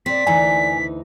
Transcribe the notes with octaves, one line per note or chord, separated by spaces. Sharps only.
A#2 C4 D5 B6
D2 E3 D#4 G#5